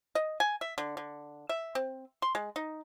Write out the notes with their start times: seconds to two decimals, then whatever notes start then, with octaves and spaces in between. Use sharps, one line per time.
0.15 D#5
0.40 G#5
0.61 E5
0.78 D3
0.97 D3
1.49 E5
1.75 C4
2.22 C6
2.35 G#3
2.56 D#4